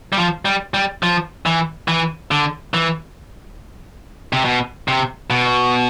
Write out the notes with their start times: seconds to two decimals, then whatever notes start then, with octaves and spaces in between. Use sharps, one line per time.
0.13 G3
0.18 F3
0.45 G3
0.74 G3
1.03 F3
1.46 E3
1.88 E3
2.31 D3
2.74 E3
4.33 C3
4.45 B2
4.88 C3
5.30 B2